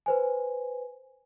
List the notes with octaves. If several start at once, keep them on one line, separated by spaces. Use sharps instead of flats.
B4 C5 G#5